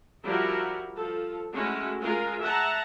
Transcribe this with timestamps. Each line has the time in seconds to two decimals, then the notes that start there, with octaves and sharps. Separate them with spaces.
0.23 F3 G3 E4 F#4 A#4
0.95 F3 A4
1.52 G#3 A3 C#4 E4 F#4
2.00 G#3 F4 G#4 A#4
2.42 E5 F#5 A5 A#5